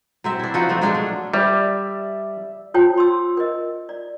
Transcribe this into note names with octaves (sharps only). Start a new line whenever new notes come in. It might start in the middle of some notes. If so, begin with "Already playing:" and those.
F#3 C4 E5
D4 E4
F3 D#4 F#4 F#5
F3 A3 C4
F#3 G#3 C#4 D4
A3
G3 D5 E5
F4 A4 C5 C#5 G5 A5
C6 E6
A#4 D#5
D5